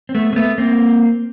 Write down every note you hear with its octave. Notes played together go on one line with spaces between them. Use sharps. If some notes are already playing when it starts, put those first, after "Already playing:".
C4
A3 B3
A#3
A3 B3
A#3 C4